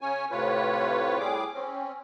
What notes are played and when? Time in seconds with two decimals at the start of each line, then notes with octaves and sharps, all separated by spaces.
0.01 C#3 C#4 C#5 G#5
0.31 A2 C3 F4 B4 C#5
1.19 A2 G3 G#4 D6
1.54 C4 C#4